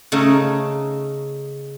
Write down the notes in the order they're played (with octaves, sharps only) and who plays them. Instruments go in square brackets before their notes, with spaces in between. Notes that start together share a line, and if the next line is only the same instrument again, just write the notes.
[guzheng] C#3 A3 D#4